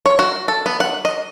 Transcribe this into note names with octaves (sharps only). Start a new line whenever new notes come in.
C#5
F#4
A4
B3
F#5
D#5